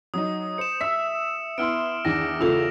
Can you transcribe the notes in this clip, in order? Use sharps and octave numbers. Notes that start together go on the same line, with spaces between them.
F#3 D#4 D#6
C5 C#7 E7
E5 E6 B6
B3 E4 C6 E6 F6 D7
E2 D#3 D4 D6 A#6
E2 C#3 A3 F4 A4 E6 F7